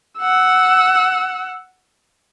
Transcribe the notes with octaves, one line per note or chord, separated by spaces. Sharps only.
F#5 E6